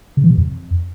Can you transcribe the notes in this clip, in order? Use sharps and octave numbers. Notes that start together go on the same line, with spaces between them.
C#3
E3
C3
F2